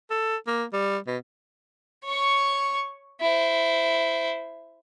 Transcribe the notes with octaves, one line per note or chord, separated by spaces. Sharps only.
A4
A#3
G3
B2
C#5 C#6
E4 C5